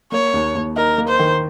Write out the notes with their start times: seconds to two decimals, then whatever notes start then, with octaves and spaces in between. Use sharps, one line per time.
0.12 A#3 C#5
0.34 D#2
0.55 D#2
0.76 D#4 A#4
0.98 A#3
1.08 C5
1.19 D#3